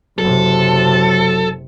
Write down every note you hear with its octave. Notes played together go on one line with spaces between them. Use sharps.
F#1 C3 F#3 A4